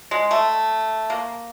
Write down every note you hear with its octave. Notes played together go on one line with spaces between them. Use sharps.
G#3
A3
A#3